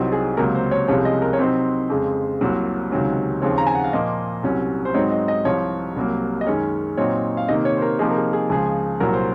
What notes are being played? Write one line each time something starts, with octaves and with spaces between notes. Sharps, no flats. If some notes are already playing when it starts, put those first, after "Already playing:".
Already playing: C2 C3 F#3 C4 D#4
G#4
C#2 C3 F#3 A#3 A#4
C5
C#5
C2 C3 F3 G#3 C#4 C#5
D#5
A#4
C#5
C3 F#3 C4 D#4 C5
F2 C#3 G#3
C2 C3 F#3 A#3
C#2 C3 D#3 F#3 C#4
D#2 C#3 F3 C4 C#5
A#5
G#5
F#5
F5
A#2 F3 A#3 D#5
C2 C3 F#3 C#4
C5
G#2 F#3 C4 D#4 C#5
D#5
D#5
C2 C3 F3 C#5
C2 C3 F#3 A#3
D#5
F#2 D#3 G#3 C#4 C#5
A#2 F#3 C4 D#4 C#5
F5
C3 D#3 A#3 D#5
C#5
C5
A#4
C3 F3 A#3 D#4 G#4
A#4
G#4
G#4
C#2 C#3 F3 G#4
C2 A#2 F#3 A#4
C5